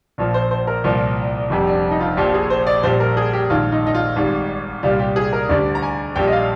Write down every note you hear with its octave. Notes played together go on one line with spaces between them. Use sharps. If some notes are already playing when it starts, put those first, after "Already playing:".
A#1 A#2 F3
C5
C5
A#4
C2 A#2 F3
F1 F2 C3 G3
D4
D#4
F4
A#1 A#2 F3 G4
G#4
C5
D5
A#1 A#2 G3 C5
A#4
G#4
G4
A#1 G#2 D#3 F4
D#4
D#4
F4
G#1 G#2 G3
C2 A#2 G3 F4
G4
G#4
A#4
D2 D3 G3 D5
A#5
G#5
A#1 A#2 G3 G5
D#5
F5